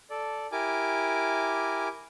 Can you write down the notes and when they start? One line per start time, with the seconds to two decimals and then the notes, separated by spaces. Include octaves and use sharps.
0.10 A4 D5
0.52 E4 G4 A#4 G#5 D6